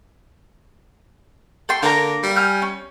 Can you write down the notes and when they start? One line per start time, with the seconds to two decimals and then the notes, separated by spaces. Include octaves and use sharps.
1.69 A4 G5 C6
1.83 D3 A#3 A#4 A#5
2.23 G3
2.36 G#5 F6 G6
2.62 C#4